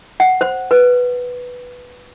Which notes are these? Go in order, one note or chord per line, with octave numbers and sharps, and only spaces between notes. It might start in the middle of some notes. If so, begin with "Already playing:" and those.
F#5
C5
B4